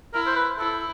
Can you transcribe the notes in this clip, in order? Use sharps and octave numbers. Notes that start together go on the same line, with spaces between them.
E4 A#4
C5
B4
E4 A4